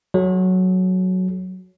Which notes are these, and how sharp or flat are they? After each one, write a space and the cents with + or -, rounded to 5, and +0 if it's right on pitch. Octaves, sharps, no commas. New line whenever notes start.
F#3 +0 A4 -40